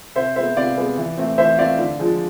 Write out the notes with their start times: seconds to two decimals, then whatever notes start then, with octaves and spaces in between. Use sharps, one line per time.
0.16 C3 C5 E5
0.36 G#3 B3 C5 E5
0.56 C3 D5 F5
0.77 G#3 B3
0.97 E3
1.17 A3 C4
1.38 E3 C5 E5
1.58 A3 C4 D5 F5
1.79 D3
1.99 F3 G#3